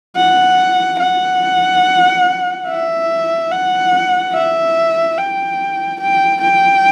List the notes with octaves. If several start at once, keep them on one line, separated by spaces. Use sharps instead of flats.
F#5
F#5
E5
F#5
E5
G5
G5
G5